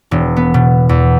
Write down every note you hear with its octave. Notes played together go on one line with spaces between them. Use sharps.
E1
B3
B2
E2